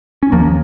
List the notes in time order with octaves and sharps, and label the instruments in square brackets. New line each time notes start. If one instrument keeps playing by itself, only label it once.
[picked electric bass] C#4
D#2 F3 A#3